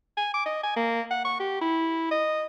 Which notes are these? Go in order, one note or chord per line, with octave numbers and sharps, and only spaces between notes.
G#5
D6
D#5
G#5
A#3
F#5
C#6
G4
E4
D#5